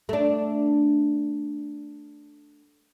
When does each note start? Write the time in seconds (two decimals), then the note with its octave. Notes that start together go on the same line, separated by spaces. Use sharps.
0.09 A3 D4